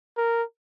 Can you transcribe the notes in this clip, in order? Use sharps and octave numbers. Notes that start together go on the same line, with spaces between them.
A#4